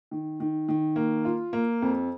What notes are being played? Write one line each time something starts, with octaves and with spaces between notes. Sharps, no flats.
D#3
D#3
D#3
A#3
F4
A#3
F2